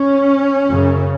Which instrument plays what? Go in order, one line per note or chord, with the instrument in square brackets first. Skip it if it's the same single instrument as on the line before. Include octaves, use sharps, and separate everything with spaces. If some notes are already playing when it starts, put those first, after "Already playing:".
Already playing: [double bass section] C#4
F#2 C#3